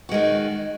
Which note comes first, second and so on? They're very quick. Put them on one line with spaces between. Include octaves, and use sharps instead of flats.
F#4 G#3 D#3